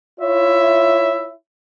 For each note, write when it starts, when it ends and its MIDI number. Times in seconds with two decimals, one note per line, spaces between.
0.20 1.33 64
0.20 1.33 65
0.20 1.33 73
0.20 1.33 76